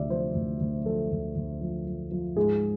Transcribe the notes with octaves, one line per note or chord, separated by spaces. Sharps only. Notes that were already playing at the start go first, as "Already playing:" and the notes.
Already playing: D2 C3 D5 E5
F3 C5
D2
D2
F3 A4
D2
D2
F3
F3
F3
G#2 G#4